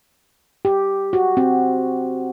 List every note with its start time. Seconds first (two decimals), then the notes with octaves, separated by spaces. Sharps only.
0.65 G4
1.13 F#4
1.37 C4